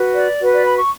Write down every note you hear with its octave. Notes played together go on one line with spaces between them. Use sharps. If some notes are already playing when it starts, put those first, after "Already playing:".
Already playing: F#4 B4
D5
F#4 B4
D5
B5
C#6